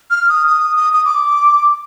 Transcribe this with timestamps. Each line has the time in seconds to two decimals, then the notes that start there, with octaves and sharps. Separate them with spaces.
0.10 F6
0.29 D#6
0.48 D#6
0.77 D#6
0.93 D#6
1.05 D6